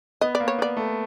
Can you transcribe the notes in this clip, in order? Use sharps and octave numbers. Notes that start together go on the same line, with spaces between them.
B3 D#5
D5
A#3
C#5
B3 D5
A3